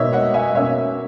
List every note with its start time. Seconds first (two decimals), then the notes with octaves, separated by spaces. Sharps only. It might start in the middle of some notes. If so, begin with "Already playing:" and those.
Already playing: B2 A#3 D#4 C#5 E5
0.13 D#5 F#5
0.34 E5 G#5
0.54 B2 A#3 C#4 C#5 E5